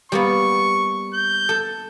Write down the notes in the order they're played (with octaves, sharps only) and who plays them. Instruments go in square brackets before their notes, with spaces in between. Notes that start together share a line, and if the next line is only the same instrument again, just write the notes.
[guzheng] G3 A#3 B3 [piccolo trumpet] C#6
[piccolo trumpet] G6
[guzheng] A4